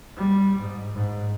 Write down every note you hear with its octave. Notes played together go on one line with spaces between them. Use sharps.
G3
G#2
G#2